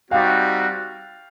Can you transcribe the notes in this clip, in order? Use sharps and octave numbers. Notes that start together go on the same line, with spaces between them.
G3 C4 D#4 F#4 F5 G5